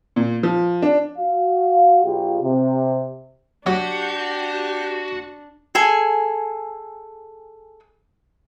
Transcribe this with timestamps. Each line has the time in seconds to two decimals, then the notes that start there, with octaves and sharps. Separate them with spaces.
0.16 A#2
0.43 F3
0.82 D4
1.18 F#4 F5
2.04 B1 F4 G4 G#4
2.42 C3
3.67 F#3 D4 F#4 G4
5.75 G#4 A4 G#5